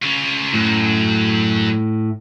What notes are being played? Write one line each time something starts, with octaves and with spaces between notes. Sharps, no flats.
C#3 F4
F#2 A2